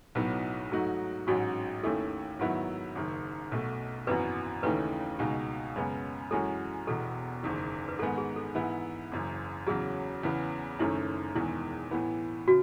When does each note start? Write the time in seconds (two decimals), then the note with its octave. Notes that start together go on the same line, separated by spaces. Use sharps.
0.15 B1 A2 F#3 B3 D#4
0.71 G#2 F#3 A3 D#4 F#4
1.27 A1 G#2 F#3 C#4 F#4
1.83 D#2 D#3 A3 C#4 E4 A4
2.39 G#2 D#3 F#3 B3 E4
2.95 F#1 F#2 D#3
3.52 B1 B2 A3
4.07 G#1 F#2 E3 B3 F#4 B4
4.63 D#2 C#3 E3 A3 D#4 B4
5.19 C#2 B2 G#3 D#4
5.76 F#2 C#3 G#3 B3
6.31 F#2 E3 G#3 C#4 F#4 A4
6.87 E1 E2 B2 A4
7.43 F#1 E2 D#3
7.89 B4
7.99 G#2 D#3 G#3 B3 A4
8.18 G#4
8.36 A4
8.55 G#2 E3 B3 E4
9.12 F#1 F#2 E3
9.67 E2 C#3 F#3 G#4
10.23 E2 C#3 E3 B3
10.79 F#1 F#2 D#3 A3 C#4 E4
11.35 E1 E2 D#3 G#3 E4
11.91 A2 E3 B3
12.47 C#3 F#4